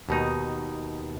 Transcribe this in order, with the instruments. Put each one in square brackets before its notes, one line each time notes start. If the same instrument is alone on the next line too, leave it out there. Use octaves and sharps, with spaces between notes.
[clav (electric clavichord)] D#2 B2 D#4